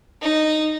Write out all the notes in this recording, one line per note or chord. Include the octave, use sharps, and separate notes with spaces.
D#4